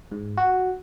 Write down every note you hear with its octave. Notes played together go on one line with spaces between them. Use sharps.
G#2
F#4